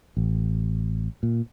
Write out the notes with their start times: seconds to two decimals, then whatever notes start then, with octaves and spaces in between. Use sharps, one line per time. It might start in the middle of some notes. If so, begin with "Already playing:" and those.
0.17 A1
1.23 A#2